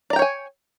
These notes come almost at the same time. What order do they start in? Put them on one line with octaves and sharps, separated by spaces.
D5 A#5 G5 C#5 G#5